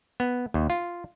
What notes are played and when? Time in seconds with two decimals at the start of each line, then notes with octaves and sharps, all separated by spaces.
0.20 B3
0.54 D#2
0.70 F4